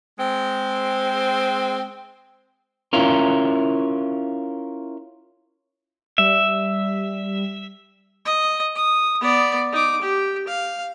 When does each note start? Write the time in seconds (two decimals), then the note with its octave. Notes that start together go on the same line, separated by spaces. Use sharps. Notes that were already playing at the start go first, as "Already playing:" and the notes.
0.19 G#3 C4
2.93 C#4 E4 F4 A#4
6.18 G3 E5
8.26 D#5
8.76 D#6
9.20 B3 D5
9.72 D#4 D6
10.02 G4
10.48 F5